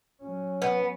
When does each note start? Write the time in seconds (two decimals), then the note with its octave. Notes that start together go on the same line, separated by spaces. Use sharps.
0.22 F#3 C#4
0.62 B3